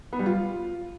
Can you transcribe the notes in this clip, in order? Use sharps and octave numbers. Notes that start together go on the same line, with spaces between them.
B3
G3
F4